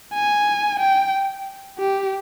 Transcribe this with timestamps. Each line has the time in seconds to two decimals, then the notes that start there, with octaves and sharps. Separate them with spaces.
0.14 G#5
0.80 G5
1.78 G4